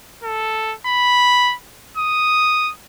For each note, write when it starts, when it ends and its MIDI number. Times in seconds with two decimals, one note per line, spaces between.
0.24 0.74 69
0.87 1.55 83
1.97 2.72 87